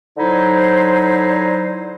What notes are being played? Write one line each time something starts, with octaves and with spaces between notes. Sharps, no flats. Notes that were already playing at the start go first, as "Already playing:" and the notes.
D3 F#3 D#4 E4 C5